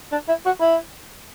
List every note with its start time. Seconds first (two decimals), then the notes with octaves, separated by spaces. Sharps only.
0.12 D4
0.28 E4
0.46 F#4
0.61 E4